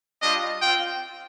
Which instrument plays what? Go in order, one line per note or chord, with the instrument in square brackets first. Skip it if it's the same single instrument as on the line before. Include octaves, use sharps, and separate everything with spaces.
[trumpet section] G3 D4 F4 D#5
C4 F4 G5